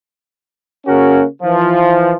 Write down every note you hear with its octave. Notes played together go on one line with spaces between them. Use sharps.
C#3 A#3 C#4 F#4 A#4
E3 F3